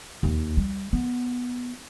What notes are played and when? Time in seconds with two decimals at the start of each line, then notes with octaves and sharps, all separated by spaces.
0.23 D#2
0.57 G3
0.93 B3